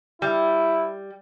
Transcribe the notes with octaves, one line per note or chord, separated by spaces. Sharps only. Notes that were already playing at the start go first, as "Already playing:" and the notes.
G3 E4